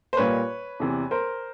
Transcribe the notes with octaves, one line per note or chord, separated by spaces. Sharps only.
C5
A#2 G3 A#3 B4 C#5
E2 C3 E3
A#4 C5